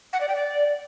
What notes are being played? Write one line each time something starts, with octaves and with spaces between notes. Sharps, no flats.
F#5
D5
G5
D5